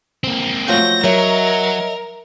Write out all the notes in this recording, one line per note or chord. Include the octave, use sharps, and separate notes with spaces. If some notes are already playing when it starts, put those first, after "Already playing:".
A#3 C4
F3 F#3 A3 G6 A#6
F#3 A#4 C#5 D#5 E5